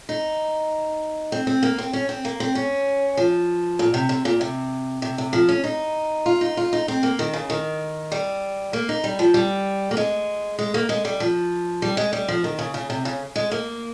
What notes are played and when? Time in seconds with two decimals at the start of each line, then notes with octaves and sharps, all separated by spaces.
0.09 D#4
1.32 C4
1.47 C4
1.63 A#3
1.78 C4
1.93 C#4
2.09 C4
2.25 A#3
2.40 C4
2.55 C#4
3.17 F3
3.79 A#2
3.94 C3
4.09 C3
4.25 A#2
4.41 C3
5.02 C3
5.18 C3
5.33 F3
5.49 C#4
5.64 D#4
6.26 F4
6.41 D#4
6.57 F4
6.73 D#4
6.88 C4
7.03 A#3
7.19 D#3
7.33 C#3
7.50 D#3
8.12 G3
8.73 A#3
8.89 D#4
9.04 G3
9.19 F3
9.34 G3
9.91 A#3
9.97 G#3
10.59 G#3
10.74 A#3
10.89 G#3
11.05 G3
11.20 F3
11.82 G3
11.97 G#3
12.13 G3
12.28 F3
12.44 D#3
12.59 C#3
12.74 C#3
12.90 C3
13.05 C#3
13.36 G#3
13.51 A#3